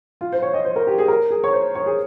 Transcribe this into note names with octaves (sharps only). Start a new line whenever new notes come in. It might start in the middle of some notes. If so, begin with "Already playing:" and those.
F4
C5
C#5
D#5
C5
A#4
G4
G#4
A#4
G#4
C#5
C5
C#5
G#4